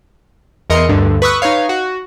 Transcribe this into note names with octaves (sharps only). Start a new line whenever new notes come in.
E2 E3 A#4 D#5 C6 C#7
D2 G2 D3
B4 B5 C#6 D#6 E6 F#6
D#4 B4 C#5 F5
F#4